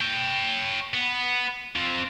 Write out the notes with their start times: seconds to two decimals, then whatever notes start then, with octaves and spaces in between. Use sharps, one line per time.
0.01 C#5 G5
0.94 B3
1.76 C4 F4